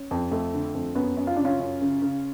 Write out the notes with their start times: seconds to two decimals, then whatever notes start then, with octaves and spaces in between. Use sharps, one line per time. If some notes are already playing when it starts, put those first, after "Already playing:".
Already playing: C#4
0.11 F2
0.31 F2 A3
0.54 D3
0.75 F2
0.95 F#2 B3
1.17 F#2
1.27 F4
1.36 C#3 D4
1.45 C#4 F4
1.60 F#2
1.81 C#3
2.02 C#3